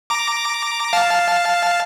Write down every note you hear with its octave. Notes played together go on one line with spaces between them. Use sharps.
A#5 D6
F5 A5